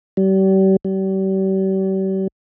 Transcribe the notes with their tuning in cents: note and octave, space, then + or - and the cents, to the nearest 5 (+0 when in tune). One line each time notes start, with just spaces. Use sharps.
G3 -40
G3 -40